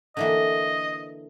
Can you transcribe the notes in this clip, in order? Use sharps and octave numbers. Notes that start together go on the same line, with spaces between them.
D3 E3 A#3 D#5